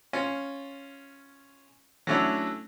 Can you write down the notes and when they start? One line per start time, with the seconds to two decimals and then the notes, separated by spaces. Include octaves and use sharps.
0.13 C#4 F4
2.07 F#3 A3 C#4 D4 E4